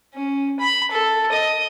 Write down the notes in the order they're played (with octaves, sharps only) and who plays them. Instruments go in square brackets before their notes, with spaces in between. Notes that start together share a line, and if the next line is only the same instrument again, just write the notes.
[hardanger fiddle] C#4
B5
A4
D#5